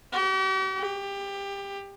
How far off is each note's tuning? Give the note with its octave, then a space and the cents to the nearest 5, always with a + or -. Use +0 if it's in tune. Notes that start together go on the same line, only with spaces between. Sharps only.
G4 -45
G4 +20